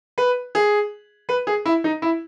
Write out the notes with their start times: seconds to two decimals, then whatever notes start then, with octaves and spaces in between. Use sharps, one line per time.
0.18 B4
0.55 G#4
1.29 B4
1.47 G#4
1.66 E4
1.84 D#4
2.02 E4